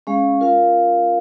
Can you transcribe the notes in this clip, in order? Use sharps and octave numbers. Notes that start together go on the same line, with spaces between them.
G#3 C#4 G#4 F5
F4 A#4 F5